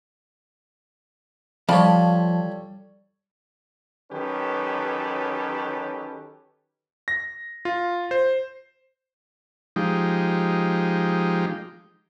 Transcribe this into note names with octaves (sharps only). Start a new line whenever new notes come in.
F3 G3 A4 C#5 B5
D#3 F#3 C#4 G4 A4 B4
A#6
F4
C5
F3 G#3 D#4 G4